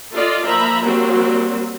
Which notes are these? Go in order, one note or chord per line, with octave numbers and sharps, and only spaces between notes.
F4 A4 D5 D#5
F3 A#3 E5 A#5 B5
F#3 G3 A#3 C4 F#4